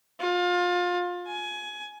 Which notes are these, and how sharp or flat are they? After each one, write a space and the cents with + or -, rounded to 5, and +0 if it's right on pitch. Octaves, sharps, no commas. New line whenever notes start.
F4 +25
G#5 +20